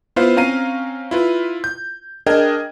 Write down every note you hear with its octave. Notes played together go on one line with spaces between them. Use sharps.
B3 E4 F4 B4 C5 F5
C4 C#4 F5 A#5 C7 D#7
E4 F4 B4
G6
D4 G#4 A#4 D#5 G5 G#6